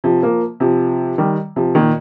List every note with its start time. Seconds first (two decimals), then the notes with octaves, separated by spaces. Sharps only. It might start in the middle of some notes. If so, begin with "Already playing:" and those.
0.04 C3 F3
0.23 F3 A#3
0.60 C3 F3
1.18 D#3 G3
1.56 C3 F3
1.75 A#2 D#3